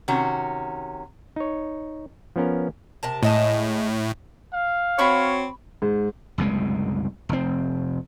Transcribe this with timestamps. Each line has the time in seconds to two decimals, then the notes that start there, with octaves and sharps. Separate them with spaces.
0.08 C3 D#3 C#4 F#4
1.36 D#4 C#5
2.36 F3 B3 C#4 A#4
3.03 C3 A#4 A5
3.23 A2 G#3 D#5 A5
4.53 F5
4.99 C4 F#4 C#5 B5 C#6
5.82 G#2
6.38 F#1 C2 B2 G#3
7.29 F1 C4